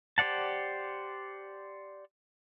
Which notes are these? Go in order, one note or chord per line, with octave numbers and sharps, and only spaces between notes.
G4 C5 D5 F#5 A5